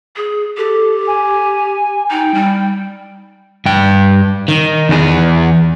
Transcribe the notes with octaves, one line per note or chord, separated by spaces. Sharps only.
G#4
G4 A4
G#5
D#4 G5
G3
G2 G5
D#3
E2 G#4